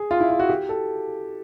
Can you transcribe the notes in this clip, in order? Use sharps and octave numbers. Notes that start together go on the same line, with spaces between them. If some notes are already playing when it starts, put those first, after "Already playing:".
Already playing: G#4
F4
E4
F4
F#4
G4
A4